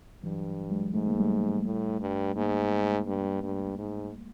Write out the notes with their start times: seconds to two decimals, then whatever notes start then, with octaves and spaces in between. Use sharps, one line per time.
0.23 G2 E3 F#3
0.71 F#3 G#3
0.94 G#2 A3
1.07 A#3
1.20 G3 A3
1.65 A2
2.01 G2
2.36 G#2 G#3 A#3
3.06 G2
3.43 G2
3.78 G#2